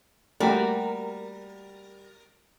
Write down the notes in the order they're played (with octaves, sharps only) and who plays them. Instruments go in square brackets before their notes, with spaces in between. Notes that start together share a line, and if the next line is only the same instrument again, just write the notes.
[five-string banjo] G3 F#4 [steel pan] A3 A#3 G4 [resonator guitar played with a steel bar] A#4